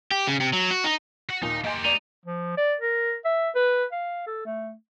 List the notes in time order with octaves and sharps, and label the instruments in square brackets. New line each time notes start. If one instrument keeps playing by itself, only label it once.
[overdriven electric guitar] G4
C#3
C3
F#3
F#4
D#4
[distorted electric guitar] F#4 F#5
[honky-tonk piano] D#2 A#2 D#3 [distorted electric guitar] D#4
[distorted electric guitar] A#3 G4 [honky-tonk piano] D#5 G#5 C6
[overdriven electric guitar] D#4 [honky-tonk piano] D5
[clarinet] F3
D5
A#4
E5
B4
F5
A4
A3